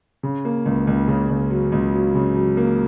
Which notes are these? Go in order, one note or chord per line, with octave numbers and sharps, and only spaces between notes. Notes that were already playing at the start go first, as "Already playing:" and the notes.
C#3
A#3
C#2
C#2
C#3
C#2
F#3
C#2
F#3
C#3
F#3
A#3